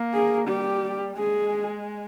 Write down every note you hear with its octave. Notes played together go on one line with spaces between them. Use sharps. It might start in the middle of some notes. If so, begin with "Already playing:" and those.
Already playing: A#3
G#4
G3 G4
G#3 G#4